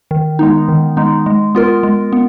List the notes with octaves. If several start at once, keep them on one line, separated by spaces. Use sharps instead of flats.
D#3
G#3 B3 D#4
D#3
G#3 B3 D#4
G#3
B3 F4 A#4
G#3
B3